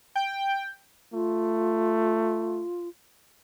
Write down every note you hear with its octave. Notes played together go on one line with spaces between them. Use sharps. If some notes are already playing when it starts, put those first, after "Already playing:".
G5
A3 F4